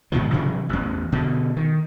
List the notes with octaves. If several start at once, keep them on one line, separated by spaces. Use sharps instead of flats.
G#2 B2 D#3 F3
C3 E3 F#3 D4
A1 E2
B2 D3
D#3